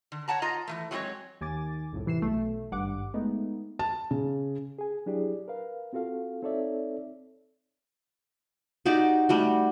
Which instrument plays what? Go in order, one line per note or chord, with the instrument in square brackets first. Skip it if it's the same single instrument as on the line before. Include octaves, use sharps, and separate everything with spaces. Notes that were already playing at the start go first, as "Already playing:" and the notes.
[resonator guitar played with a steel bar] D3
C#5 D#5 F#5 A5 A#5
F4 D#5 A#5
E3 F3 A3
F#3 G#3 C4 F4 F#4 C#5
[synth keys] D#2 G#5 D6 A6
C2 F2 A2
C3 E3 C7 E7
B1 A3
G#1 G2 F#5 D6
G#3 A3 B3 D#4
[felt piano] A5
C#3
[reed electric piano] G#4 G#5
F#3 D4 E4 G4 G#4 D5
A#4 B4 F5
C4 F4 F#4 A4 F5
C4 D#4 A4 C#5 D5 E5
[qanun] D#4 F#4 G4 D5
G3 A3 F#4